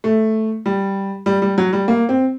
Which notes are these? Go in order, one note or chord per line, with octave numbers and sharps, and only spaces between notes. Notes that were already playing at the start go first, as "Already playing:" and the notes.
A3
G3
G3
G3
F#3
G3
A#3
C4